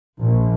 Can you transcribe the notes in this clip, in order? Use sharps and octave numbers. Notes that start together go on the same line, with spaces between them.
A#1